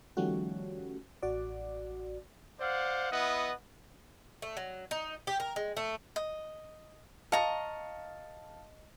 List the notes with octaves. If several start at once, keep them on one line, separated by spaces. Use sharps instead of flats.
D#3 F3 G3 A3 C#4 F#4
A1 F#4 D5
C5 D5 F5 F#5
B3 E4 D#5 F#5
A3
F#3
D#4
G4
A#4
G#3
A3
D#5
D#5 F5 A5 A#5 C#6 C#7